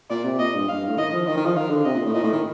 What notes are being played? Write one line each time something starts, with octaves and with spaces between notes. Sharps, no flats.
A#2 D5
C3
A#2 D#5
G2
G2 F5
G2
A2
D#3 D#5
F3
D#3 D#5
D#3
F3
D#3 F5
D3
C3 D#5
A#2
A2
A#2 D#5
A2
D#3